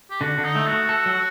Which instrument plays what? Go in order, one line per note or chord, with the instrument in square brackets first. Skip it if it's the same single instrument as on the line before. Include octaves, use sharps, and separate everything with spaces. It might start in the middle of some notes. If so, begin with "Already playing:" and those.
[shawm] G4
[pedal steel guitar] D3 [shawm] F#4
[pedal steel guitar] D3
[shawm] D#4
[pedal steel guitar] A3
[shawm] F#4
[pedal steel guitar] A3
A4
F#3